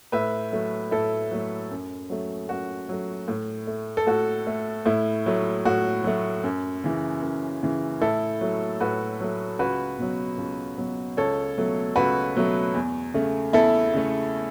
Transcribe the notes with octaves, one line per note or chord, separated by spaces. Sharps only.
A2 B4 E5
F#3 A3
A2 E4 A4
F#3 A3
F#2
F#3 A3
F#2 F#4
F#3 A3
A2
A3
A4
A2 F#4
A3
A2 E4
F#3 A3
A2 F#4
F#3 A3
F#2
C#3 E3
F#2
C#3 E3
A2 E4 A4
F#3 A3
A2 F#4 B4
F#3 A3
C#2 F#4 B4
B2 F#3
C#2
B2 F#3
C#2 A4 C#5
B2 F#3 A3
C#2 F#4 B4
B2 F#3 A3
E2
C#3 A3
E2 E4 A4
C#3 A3